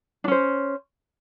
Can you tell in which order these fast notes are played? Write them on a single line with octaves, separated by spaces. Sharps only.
D4 C#4 C5